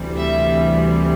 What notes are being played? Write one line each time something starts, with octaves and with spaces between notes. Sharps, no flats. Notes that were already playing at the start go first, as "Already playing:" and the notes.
Already playing: D2 C3 E3 G3
E5